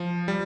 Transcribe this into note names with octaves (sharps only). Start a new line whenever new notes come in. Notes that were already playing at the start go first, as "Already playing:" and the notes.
Already playing: F3
G3